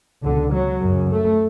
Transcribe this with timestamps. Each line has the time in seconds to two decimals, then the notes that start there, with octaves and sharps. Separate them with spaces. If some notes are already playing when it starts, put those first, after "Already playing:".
0.23 C#2 B2 D3
0.53 F#3
0.81 F#2 C#3
1.10 A3